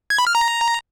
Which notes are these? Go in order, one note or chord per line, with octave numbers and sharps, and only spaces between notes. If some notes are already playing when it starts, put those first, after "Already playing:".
G#6
B5
F6
A#5